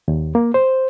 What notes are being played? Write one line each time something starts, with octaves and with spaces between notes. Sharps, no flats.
D#2
A#3
C5